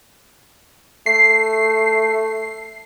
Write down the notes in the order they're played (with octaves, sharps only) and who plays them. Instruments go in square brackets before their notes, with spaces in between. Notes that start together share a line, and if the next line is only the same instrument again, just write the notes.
[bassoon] A3 [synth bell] C7